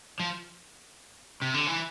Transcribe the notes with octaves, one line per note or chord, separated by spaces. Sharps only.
F3
C3
D3
E3